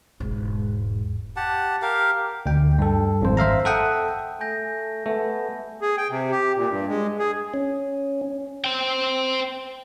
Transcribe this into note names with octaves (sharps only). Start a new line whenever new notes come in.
E1 G#2
G4 F#5 A5
G4 A#4 F5
D2 G5
G2 A4
G#1 F2 C5
C5 E5 F5 A#5
A4 E5 F#5 G5 D#6
A3 G#5 G6 A#6
A3 B3
G#4
G5
C3
G4
A#2
G2
G#3
G#4
C#4
C5 G5